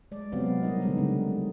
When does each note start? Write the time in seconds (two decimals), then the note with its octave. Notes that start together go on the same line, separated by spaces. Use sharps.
0.11 G#3 D5
0.32 C3 F#3 B3 C4 D5 F5
0.63 F#3 G3 A#3 D#4 A#4 D#5
0.81 D3 D#3 G3 G#3 B3 D#4
0.98 C#3